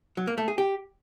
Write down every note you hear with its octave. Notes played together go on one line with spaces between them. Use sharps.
F#3
A#3
A3
G#4
G4